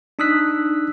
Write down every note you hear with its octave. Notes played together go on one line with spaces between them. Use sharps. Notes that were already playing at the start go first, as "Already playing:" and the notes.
D4 D#4 D#6 E6 F#6 B6